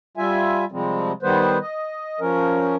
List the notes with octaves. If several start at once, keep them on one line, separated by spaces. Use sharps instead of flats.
G3 F4 E5 G#5
C3 F3 G3 G#3 C4
D#3 G3 B3 B4 C5
D#5
F3 C#4 A#4